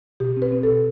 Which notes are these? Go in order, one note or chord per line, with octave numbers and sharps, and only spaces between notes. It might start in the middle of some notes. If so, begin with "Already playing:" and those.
B2 G4
C4
B4
C4
A4
B2